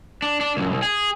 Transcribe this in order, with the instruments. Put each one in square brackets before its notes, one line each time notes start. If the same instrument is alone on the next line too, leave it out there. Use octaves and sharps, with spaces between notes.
[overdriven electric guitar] D4
D4
C#2 F#2
C2
G#4